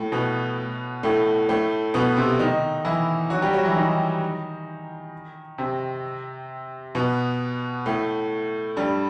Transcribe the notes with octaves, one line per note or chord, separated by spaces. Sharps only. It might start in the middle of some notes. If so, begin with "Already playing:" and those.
Already playing: A2 A3
B2 B3
A2 A3
A2 A3
B2 B3
C3 C4
D#3 D#4
E3 E4
F#3 F#4
G3 G4
F#3 F#4
E3 E4
D#3 D#4
C3 C4
B2 B3
A2 A3
G2 G3